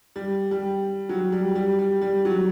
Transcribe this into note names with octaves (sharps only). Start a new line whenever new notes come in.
G3
G3
F#3
G3
G3
G3
G3
F#3